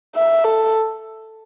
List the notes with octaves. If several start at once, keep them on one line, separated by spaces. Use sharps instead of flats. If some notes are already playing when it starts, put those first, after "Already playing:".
E5
A4